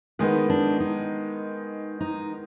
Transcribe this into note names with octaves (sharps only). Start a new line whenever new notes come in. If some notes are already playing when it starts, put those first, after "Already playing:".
D#3 G#3 B3 D#4
D4
D#4
D#4